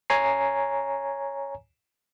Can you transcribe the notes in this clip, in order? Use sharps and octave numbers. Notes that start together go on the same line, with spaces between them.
C#5 G#5 A#5 C7